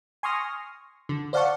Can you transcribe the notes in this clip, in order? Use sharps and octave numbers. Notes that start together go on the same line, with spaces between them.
G#5 C6 C#6 D#6 F6 A#6
D3
C5 D5 F5 F#5 A5 C#6